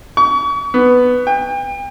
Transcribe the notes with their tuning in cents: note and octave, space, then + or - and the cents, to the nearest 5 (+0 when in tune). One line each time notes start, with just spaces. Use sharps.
C#6 +35
B3 +5
G5 +35